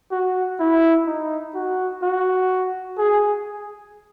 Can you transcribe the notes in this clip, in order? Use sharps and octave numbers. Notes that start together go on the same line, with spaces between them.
F#4
E4
D#4
F#4
F#4
G#4